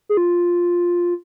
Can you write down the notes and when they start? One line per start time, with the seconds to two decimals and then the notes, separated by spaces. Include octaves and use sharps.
0.09 G#4
0.17 F4